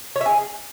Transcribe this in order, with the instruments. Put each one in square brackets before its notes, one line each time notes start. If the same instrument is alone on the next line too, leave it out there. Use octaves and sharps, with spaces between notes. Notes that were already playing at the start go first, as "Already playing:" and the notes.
[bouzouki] C#5
E5
G#4